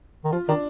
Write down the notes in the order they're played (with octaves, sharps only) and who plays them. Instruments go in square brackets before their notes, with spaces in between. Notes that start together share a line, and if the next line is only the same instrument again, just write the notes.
[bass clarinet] D#3
[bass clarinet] F3 [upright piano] F4
[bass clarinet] D#3 [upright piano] D4